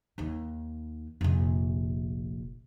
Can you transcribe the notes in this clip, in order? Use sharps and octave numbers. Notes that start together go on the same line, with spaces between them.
D#2 D#3
F1 A#1